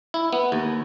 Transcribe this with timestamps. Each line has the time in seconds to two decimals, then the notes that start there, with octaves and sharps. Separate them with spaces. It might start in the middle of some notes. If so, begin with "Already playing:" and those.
0.14 E4
0.33 B3
0.52 D#2